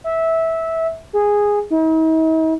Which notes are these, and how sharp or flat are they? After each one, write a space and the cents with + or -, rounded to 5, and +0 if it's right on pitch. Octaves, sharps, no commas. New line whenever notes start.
E5 -15
G#4 -10
D#4 +45